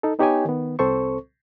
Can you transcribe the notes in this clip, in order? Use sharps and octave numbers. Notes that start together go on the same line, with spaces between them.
D#4 A4
B3 D#4 G4 C#5 G5 G#5
D#3 B3
C2 C4 A4 C5 C#6